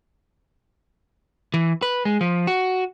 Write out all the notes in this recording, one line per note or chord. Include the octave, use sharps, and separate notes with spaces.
E3
B4
G#3
F3
F#4